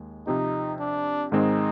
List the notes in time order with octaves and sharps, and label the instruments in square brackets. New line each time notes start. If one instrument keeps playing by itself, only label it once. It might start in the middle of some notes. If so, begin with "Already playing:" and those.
Already playing: [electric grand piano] D#2 G#3
[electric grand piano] C3 F3 C4 G4 [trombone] D#4
[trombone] D4
[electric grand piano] G#2 D#3 G#3 C4 [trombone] D#4